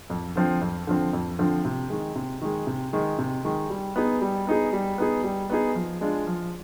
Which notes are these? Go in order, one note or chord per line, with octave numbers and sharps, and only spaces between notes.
F2
D3 F3 C4
F2
D3 F3 C4
F2
D3 F3 C4
C3
D#3 G#3
C3
D#3 G#3
C3
D#3 G#3
C3
D#3 G#3
G3
B3 D#4 G#4
G3
B3 D#4 G#4
G3
B3 D#4 G#4
G3
B3 D#4 G#4
F3
G#3 D4 F4
F3